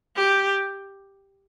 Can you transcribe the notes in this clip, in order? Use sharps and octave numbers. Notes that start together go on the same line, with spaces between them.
G4